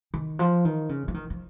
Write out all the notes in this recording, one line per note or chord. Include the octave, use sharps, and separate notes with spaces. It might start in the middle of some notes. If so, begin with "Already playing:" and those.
D#3
F3
D#3
C#3
F3
D#3
F3